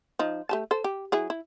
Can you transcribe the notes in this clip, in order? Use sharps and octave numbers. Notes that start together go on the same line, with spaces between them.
F3 D#4
A3 G4 A5
A4 C5
G4
F#3 E4 G#4
E4